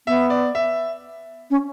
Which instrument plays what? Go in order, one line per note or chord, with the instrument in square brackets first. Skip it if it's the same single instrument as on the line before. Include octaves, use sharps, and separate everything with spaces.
[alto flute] B3 [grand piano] E5
[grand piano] D5
E5
[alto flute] C#4